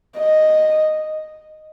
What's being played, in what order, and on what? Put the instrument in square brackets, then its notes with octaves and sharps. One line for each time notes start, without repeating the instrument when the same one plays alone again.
[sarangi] D#5